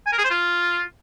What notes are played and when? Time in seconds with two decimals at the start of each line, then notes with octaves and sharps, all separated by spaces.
0.06 G#5
0.12 A#4
0.19 G#4
0.25 C5
0.31 F4